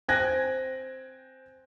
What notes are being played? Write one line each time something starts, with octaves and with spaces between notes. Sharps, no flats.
C4 G5 G#5 F#6 G#6 A#6